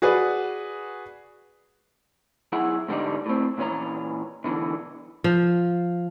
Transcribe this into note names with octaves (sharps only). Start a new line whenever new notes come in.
F#4 G#4 B4 D5 F#5
B1 E4 G#4 F#5
G#2 D3 G3 C4 D#4 D5
A2 C4
A#2 E3 C#4 C#5 A#5
B2 D3 E3
F3